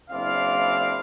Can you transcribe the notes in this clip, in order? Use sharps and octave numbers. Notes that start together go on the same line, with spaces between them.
F#1 C4 D4 E4 D5 F5